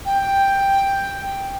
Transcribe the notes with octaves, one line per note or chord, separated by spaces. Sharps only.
G5